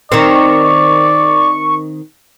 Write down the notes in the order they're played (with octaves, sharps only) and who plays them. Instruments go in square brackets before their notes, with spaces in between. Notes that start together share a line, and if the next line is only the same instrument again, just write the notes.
[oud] D#3 C4 [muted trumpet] D5 [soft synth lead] C#6